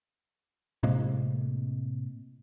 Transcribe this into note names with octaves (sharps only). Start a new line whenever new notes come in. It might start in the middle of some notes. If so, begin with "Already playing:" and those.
A2 C3 G#3 A#3